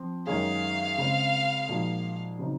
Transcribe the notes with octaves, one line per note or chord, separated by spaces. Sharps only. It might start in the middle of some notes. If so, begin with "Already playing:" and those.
Already playing: F3 C4
F#2 D#3 G#3 C#4 G#4 F5
C#3 G#3 C4
A#2 F3 G#3 D#4 F#4
C#3 F#3 C4 D#4